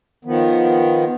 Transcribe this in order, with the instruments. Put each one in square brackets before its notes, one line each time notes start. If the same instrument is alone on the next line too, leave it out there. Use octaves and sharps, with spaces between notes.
[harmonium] D#3 F3 B3